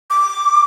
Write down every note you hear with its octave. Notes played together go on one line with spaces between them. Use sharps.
D6